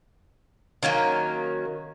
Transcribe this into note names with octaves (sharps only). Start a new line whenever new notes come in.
D#3 F#3 A#3 C#4